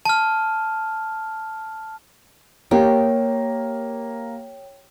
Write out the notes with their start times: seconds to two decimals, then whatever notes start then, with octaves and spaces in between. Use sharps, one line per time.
0.05 A5 F6
2.71 A#3 G4 C#5 G5